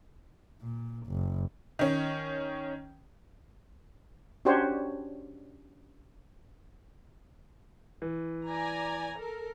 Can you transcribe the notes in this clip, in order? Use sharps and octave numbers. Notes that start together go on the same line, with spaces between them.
A#2
F#1
D#3 C#4
C#4 D4 F#4 G4 C5 C#5
E3
D5 G#5 A#5
A4 A#4